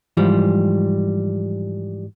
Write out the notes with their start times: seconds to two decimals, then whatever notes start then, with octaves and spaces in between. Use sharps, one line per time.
0.17 G#2 E3 F3 G3